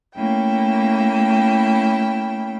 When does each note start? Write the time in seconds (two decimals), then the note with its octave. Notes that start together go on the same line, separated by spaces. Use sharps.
0.16 A3 A#3 C#4 E4 G5